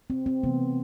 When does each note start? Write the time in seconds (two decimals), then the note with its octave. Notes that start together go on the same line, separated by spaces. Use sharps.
0.10 C4
0.26 C4
0.43 C3 E3 A3 B3